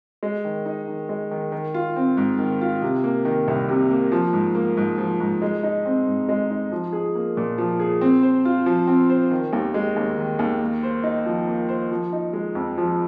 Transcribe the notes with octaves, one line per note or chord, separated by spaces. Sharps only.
G#3
D#3
D#4
D#3
G#3
D#3
D#3
F4
C4
G#2
D#3
F4
C3
A#3
D#3
C2
C3
A#3
F3
G#2
A#3
G#2
F3
G#2
G#3
D#4
C4
G#2
G#3
D#4
F3
G#4
A#3
A#2
F3
G#4
C4
C5
F4
F3
C4
C5
D#3
D#2
G#3
D#2
D#3
D#2
A#3
C5
D#4
F3
A#3
C5
F3
D#4
G#3
F2
F3